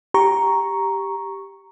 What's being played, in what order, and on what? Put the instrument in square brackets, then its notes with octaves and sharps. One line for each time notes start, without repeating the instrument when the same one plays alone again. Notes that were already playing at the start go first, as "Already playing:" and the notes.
[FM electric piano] G4 A#5 C#6